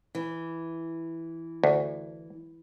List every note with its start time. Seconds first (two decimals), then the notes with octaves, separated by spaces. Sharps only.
0.15 E3
1.64 D2